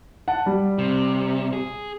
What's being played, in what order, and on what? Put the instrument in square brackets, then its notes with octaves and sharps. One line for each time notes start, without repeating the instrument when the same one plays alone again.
[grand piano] F#5 A5
G3
[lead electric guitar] C3
G#4